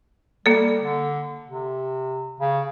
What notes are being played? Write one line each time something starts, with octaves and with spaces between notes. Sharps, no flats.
G3 A#3 A4
D3
C3
C#3